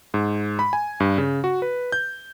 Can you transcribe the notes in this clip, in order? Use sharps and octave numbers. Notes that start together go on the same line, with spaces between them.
G#2
B5
G#5
G2
C#3
F#4
B4
G6